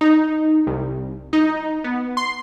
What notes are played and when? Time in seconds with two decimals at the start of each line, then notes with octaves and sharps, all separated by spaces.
0.01 D#4
0.67 C2
1.33 D#4
1.84 B3
2.17 C6